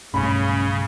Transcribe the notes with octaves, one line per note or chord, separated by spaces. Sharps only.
B1 G2 C#3 A3 C#4 B5